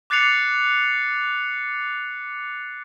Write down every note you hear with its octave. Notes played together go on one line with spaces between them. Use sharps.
D6 F#6 A6 C7 C#7 F7